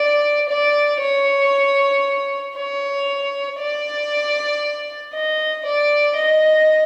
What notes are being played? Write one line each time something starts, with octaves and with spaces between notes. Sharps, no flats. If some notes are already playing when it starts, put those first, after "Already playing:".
Already playing: D5
D5
C#5
C#5
D5
D#5
D5
D#5